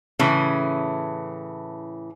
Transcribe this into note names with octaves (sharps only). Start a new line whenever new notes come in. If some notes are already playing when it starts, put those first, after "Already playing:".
A2 C#3 E3 C#4